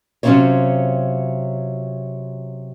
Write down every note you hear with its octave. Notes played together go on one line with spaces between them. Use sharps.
C3 F#3 C#4 F4 C5 C#5